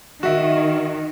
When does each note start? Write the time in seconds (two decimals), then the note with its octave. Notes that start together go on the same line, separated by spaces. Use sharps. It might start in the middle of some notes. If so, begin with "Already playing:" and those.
0.23 D#3 F#4 E5